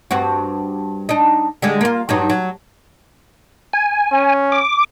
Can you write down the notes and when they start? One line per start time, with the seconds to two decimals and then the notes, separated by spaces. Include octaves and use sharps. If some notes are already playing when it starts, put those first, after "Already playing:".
0.11 G2 C4 F#4
1.09 D4 D#4
1.62 D3 G3 G#3
1.81 A#3 F4
2.09 G2 F#3 D#4
2.30 F#3
3.73 G#5
4.12 C#4
4.52 D6